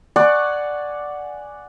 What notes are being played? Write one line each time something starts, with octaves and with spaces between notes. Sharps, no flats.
D5 F#5 G#5 C#6